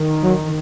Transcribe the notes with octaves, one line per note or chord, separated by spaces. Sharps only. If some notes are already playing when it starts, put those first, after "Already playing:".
Already playing: D#3
F#3